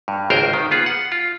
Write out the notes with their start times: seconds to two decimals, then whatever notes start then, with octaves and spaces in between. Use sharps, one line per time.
0.08 G2
0.30 G#1 C#2 A#4 C5 D#5 G5
0.53 D#3
0.71 B3 F4 G#4
0.86 F#5
1.12 F4